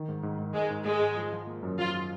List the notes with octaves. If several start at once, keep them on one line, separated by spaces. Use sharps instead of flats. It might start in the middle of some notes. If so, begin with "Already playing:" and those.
Already playing: D#3
G#2
G#2
G#2
G#2 G#3
G#2
G#2 G#3
G#2
F3
F3
A#3
F#2
F3 F4